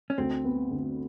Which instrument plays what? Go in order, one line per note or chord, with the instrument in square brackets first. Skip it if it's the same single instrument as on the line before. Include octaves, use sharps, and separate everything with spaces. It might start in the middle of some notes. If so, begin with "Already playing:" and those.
[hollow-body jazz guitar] C#4
[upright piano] D2 [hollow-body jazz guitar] C4
[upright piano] B3
D3